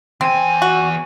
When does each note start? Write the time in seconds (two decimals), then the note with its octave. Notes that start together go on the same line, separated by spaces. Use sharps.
0.21 E2 C4 G#5
0.62 F#4